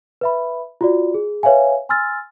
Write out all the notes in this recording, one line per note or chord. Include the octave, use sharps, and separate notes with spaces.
B4 E5 B5
F4 F#4 D5
G#4
B4 C#5 E5 F5 G#5
G#5 C6 E6 F6 A6